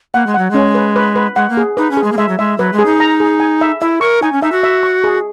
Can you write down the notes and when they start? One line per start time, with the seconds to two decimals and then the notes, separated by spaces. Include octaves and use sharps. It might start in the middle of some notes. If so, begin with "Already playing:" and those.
0.14 A#3 F#5
0.27 G#3
0.34 F#3 F#5
0.51 G#3 C#4
0.75 B4
0.96 B4
1.16 B4
1.36 G#3 F#5
1.50 A#3
1.57 G#4
1.77 D#4 B4
1.91 C#4
1.97 G#4
2.04 G#3
2.12 A#3
2.17 G#3 E5
2.29 F#3
2.39 G#3 E5
2.58 F#3 B4
2.73 G#3
2.79 G#4
2.86 D#4
3.00 A#5
3.20 G#4
3.40 G#5
3.61 E5
3.81 E4 E5
4.01 A#4 C#6
4.23 D#4 G#5
4.33 C#4
4.42 D#4 E5
4.52 F#4
4.63 E5
4.83 C#6
5.04 G#4